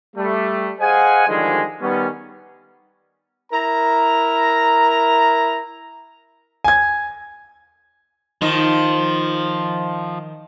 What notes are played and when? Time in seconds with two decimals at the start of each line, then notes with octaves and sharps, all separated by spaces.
0.17 G3 A3
0.80 G#4 C5 D#5 F5 F#5 G#5
1.28 D3 D#3 F3 G3 G#3 G#4
1.81 D#3 G3 B3 C#4
3.52 E4 A#4 A#5
6.64 G#5 G#6
8.42 D#3 F3